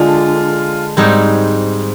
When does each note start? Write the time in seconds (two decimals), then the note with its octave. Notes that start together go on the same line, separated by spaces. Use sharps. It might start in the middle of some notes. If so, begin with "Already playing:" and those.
Already playing: D3 G#3 D4 F4
0.97 G#2 G3 C4 D#4